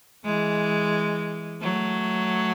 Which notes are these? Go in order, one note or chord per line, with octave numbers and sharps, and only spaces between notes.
E3 G#3
F#3 A3